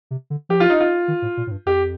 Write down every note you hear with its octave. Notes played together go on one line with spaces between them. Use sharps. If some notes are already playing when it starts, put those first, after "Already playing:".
C3
D3
F3 G4
F4
D#4
F4
D#3
A2
A#2
A2
G2
F2 G4